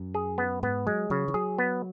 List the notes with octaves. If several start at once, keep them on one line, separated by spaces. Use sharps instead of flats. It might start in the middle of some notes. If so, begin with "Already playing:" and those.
Already playing: F#2
G#4
B3
G#2 B3
F#3 G#3
C#3 F#3
E3
F#3 G#4
B3